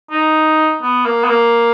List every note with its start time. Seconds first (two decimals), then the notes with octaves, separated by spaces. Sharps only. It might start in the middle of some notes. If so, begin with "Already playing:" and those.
0.11 D#4
0.82 B3
1.06 A#3
1.24 B3
1.29 A#3